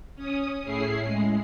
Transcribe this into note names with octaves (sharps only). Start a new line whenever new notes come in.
C#4 D#6
A2 C#4 E4 G#4 C7
G#3